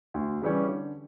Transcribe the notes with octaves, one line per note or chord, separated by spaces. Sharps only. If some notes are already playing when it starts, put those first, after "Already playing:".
D2
C#3 E3 G3 C#4
D3